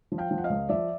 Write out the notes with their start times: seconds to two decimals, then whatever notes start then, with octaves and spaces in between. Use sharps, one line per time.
0.12 F3
0.18 F5 G5
0.31 F3
0.38 F#5
0.44 D#5 F5
0.50 C#2
0.69 F3 D5 E5